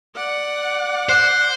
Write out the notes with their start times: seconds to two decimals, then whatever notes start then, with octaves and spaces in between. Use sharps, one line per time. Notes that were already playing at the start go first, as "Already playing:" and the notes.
0.15 D5 F#5
1.09 C5 F#6